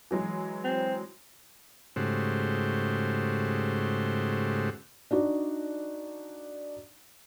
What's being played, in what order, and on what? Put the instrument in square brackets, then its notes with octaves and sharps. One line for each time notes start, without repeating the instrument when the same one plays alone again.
[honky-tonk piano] E3 F#3 G#3
[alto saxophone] C4
[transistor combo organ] G#2 C#3 A3 F#4 G4 C5
[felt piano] D4 D#4 F#4 D5